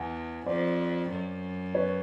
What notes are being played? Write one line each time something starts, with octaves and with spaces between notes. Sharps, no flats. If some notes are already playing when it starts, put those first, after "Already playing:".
Already playing: E2 F#5 G#5
F2 C5 D5
F#2
B4 C#5